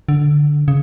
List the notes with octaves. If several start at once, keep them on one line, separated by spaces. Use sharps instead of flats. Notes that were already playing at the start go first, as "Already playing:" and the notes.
D3
C#3